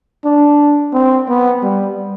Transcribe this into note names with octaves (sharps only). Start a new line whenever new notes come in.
D4
C4
B3
G3